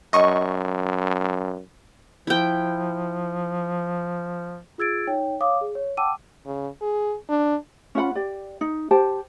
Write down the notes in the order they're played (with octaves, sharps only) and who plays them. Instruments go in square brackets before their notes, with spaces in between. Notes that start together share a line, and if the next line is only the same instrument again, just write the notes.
[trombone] F#2 [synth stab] D#5 C#6
[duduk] F3 [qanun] E4 G5
[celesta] F4 G#4 E6 G#6 A6 D7
D#4 C#5 G5
C#5 F5 D6 D#6
G#4
C#5
F#5 G5 A5 D6 E6 D#7
[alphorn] C#3
G#4
D4
[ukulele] C#4 F4 F#5 B5
G4 D5
D#4
G4 C5 G5 A5